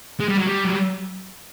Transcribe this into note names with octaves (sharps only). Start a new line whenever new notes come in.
G#3
G3
F#3
G3
F#3